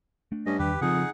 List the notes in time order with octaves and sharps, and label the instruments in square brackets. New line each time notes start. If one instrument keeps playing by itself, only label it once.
[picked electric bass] A3 D4
[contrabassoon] G2 [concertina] C#4 D#5
[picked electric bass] E2 D#3 [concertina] G4 B4
[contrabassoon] F2 [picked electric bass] C#3 F3 [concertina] D#4 G#4 F#5